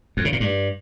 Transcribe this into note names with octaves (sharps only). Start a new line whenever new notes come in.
F2
C#3
A#2
G2